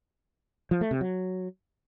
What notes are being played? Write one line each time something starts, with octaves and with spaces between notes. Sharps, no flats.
F3
A3
C3
F#3